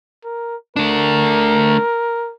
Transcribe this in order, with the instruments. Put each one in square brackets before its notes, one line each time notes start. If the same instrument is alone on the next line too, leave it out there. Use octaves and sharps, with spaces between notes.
[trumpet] A#4
[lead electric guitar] A3 D4 [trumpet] A#4